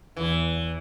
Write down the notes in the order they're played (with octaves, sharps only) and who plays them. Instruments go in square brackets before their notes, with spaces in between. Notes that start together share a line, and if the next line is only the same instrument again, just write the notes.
[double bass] E2 [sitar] E3